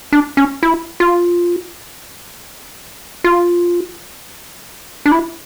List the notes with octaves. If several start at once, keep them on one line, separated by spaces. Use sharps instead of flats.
D4
C#4
E4
F4
F4
D4
E4